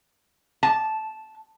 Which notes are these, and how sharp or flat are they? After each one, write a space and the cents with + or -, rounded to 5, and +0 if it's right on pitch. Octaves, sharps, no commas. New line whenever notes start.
A5 -10